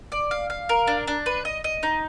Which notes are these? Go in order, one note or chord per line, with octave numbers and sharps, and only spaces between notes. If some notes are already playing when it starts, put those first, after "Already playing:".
D5
F5
F5
A#4
D4
D4
B4
D#5
D#5
D#4